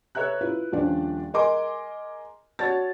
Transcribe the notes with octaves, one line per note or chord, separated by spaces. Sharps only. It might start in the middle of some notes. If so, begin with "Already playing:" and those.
A4 B4 C#5 E5 A#5 F#6
E4 F4 B4
D#1 F3 C#4 D4 D5
G#4 A#4 D#5 G#5 C6 D6
F#4 C#5 D5 A5 A6